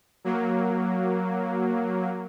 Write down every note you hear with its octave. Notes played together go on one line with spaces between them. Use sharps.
F#3 A#3